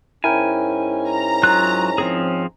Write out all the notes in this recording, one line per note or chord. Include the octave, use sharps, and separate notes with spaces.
G#2 C#4 E4 A#4 G5 G#5
A#5
F#3 F4 F#6
F3 C4 G#4